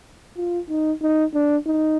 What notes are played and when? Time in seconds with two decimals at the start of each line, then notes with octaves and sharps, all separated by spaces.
0.37 F4
0.69 D#4
1.02 D#4
1.34 D4
1.67 D#4